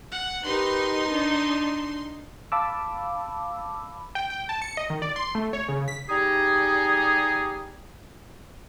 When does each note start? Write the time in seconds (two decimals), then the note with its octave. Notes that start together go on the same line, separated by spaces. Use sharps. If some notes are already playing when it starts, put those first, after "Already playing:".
0.12 F#5
0.45 D#4 G4 A#4 B4 C6
1.10 D4
2.52 F5 A5 B5 D6 E6
4.15 G5
4.30 G5
4.49 A5
4.62 C#7
4.77 D#5
4.90 D#3
5.02 D5
5.16 C6
5.35 A3
5.53 C#5
5.69 C#3
5.88 B6
6.08 G3 D#4 G4 G#4